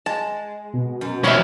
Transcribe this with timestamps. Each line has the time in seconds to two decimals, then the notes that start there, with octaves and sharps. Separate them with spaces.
0.06 G#3 A5
0.73 B2
1.01 F#2
1.24 F3 B3 G4 A#4 C#5 E5 B5